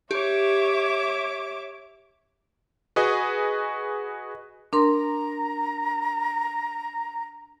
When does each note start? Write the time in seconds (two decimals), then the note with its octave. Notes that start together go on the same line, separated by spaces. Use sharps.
0.11 G4 C#5 E5 D6
2.96 F#4 G#4 B4 D#5
4.73 D4 A#4 A#5 C6